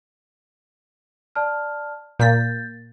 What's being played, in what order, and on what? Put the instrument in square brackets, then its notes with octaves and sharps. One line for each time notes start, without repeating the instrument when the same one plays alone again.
[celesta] D5 A5 F6
[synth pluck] A#2 A#3 B6 [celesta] G6 A6